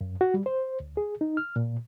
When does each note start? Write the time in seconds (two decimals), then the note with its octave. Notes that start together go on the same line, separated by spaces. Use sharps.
0.01 F#2
0.21 F#4
0.34 G3
0.46 C5
0.80 D2
0.97 G#4
1.21 D#4
1.37 F6
1.56 A#2